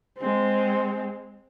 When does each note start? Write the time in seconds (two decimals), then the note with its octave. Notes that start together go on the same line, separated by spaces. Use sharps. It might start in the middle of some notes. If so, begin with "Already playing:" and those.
0.18 G#3 C4